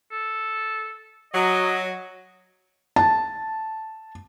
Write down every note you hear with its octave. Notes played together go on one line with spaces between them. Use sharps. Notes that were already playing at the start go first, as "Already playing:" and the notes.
A4
F#3 D#5
A5